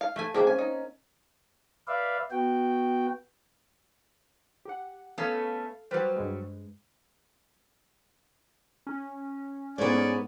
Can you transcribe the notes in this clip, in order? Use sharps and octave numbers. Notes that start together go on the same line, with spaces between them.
F5
A3 E5 G#5
G#3 A#3 C4 G4 G#4 A#4
C#4 G#5
D#4
B4 D5 E5 F5
B3 F#4 G5
G4 F#5
A3 B3 C#4 A4 F5
F#3 G3 G4 B4 C5
G2 G#3
C#4
G#2 B3 C#5 D5 G#5